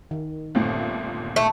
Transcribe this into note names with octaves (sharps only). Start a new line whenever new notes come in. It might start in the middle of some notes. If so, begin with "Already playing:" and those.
D#3
G1 D#2 A#2 A3 C4
A3